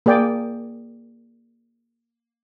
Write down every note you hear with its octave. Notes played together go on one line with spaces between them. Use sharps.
A#3 G#4 D5 G5